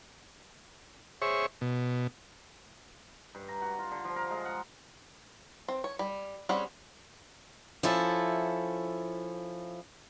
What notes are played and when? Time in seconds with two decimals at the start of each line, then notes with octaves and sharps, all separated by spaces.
1.22 G#4 C5 C#5 E5 C#6
1.61 B2
3.35 G2
3.48 A#5
3.61 F#4
3.79 F4
3.91 D3
4.04 F3
4.16 A#4
4.30 G#3
4.45 F#5
5.68 C4
5.84 C#5
5.99 G3
6.49 G3 C4 C#4 G#4 F#5
7.83 F3 C#4 E4 A4